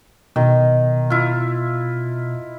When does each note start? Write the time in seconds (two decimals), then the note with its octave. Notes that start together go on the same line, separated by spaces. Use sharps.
0.36 B2 D#3
1.10 E4 F4